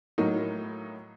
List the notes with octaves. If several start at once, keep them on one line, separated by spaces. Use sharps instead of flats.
A2 F#3 A#3 D#4